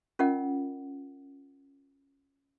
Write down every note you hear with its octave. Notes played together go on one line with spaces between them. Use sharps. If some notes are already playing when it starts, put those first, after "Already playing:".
C#4 F4 A#4 D#5 F#5